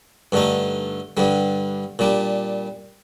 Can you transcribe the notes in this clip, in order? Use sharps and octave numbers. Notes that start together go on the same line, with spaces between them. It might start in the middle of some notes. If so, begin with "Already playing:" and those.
G2 D3 A3 D#4
G2 D3 G3
A#2 G3 D4